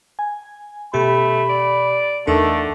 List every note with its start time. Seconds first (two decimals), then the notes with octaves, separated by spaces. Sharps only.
0.19 G#5
0.94 B2 A3 G4 B5
1.49 D5
2.27 E2 D3 A3 D#4 A#4